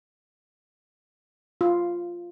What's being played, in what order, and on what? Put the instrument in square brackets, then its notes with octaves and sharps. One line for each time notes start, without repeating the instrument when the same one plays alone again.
[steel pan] F4